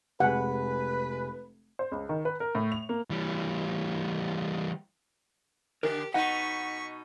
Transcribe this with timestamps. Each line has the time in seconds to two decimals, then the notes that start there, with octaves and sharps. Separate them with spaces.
0.20 F1 G#3 B4 F#5 G#5
1.79 C5
1.92 C#2
2.09 D#3
2.25 B4
2.40 A#4
2.55 A2
2.72 F7
2.89 A#3
3.10 E3 G3
5.83 D3 D4 G4 A#4
6.14 B2 D#4 B4 F#5 C#6 B6